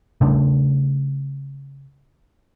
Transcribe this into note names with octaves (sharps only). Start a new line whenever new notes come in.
C#3 G3 A3 D4